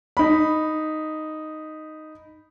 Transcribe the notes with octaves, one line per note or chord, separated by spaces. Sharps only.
D#4 B5